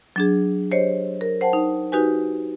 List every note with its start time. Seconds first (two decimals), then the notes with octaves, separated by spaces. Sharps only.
0.16 F#3 D4 G#4
0.71 G4 C5 C#5 D#5
1.21 A#4
1.41 C5 F#5 G5 A5
1.53 D#4
1.92 D#4 F#4 G4 B4 G#5